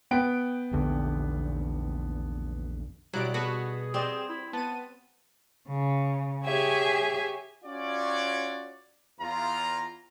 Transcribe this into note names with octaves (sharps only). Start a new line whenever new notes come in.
B3 G5 D7
A#1 E2 D3
B2 F#3 G3 E4 D5 F#6 D7
B3 F#4 G#4 A4 B4
C4 G4 D5 D#5 E7
E4
B3 A5 D#7
C#3
G4 G#4 C#5 E5 G#5
C#4 F4 F#4 C#5 D5
E2 F4 A#5